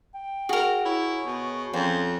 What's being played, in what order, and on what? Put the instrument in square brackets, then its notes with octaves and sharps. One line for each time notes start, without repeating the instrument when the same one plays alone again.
[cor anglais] G5
[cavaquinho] F#4 A#4 [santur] G#4 E5
[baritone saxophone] E4 [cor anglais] C#5
[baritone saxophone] B2
[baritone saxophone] F2 [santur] F3 C#4 G5 [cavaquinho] C5